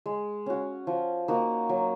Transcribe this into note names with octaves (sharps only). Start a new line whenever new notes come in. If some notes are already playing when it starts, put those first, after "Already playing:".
G#3
C#4 F#4
F3
A#3 D#4 F#4
F#3